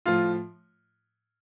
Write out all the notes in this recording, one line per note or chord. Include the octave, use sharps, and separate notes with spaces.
A2 F3 F4